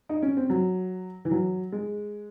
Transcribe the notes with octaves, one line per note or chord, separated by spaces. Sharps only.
D#4
C#4
C4
F#3
E3
F#3
G#3